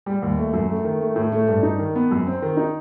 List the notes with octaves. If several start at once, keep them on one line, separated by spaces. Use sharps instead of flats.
G3
D#2
A3
F#2
A3
D#3
A3
A2
A3
G2
D#4
D#3
B3
F#2
C4
D#3
D#4